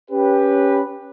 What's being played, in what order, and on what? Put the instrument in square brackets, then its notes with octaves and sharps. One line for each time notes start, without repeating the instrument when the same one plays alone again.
[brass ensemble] C#4 G4 B4